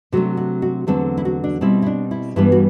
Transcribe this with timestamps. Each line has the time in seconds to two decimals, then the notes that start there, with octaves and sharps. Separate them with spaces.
0.12 C3 F#3 A3 D4 F#4
0.37 F#4
0.62 F#4
0.87 E2 D3 F#3 A3 C4 A4
1.17 E4
1.25 F#4
1.44 D4
1.61 B2 G3 C4 E4
1.82 E4
1.86 D4
2.11 E4
2.36 G2 E3 G3 B3 D4 E4
2.52 F#4